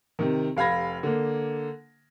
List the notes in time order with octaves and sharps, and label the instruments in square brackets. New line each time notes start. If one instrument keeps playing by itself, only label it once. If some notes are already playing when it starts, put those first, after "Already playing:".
[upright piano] C3 D#3
F1 F5 B5 G#6 A#6
D3 A#3